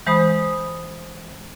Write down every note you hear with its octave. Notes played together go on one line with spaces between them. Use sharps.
E3 G#3 C5 B5 D#6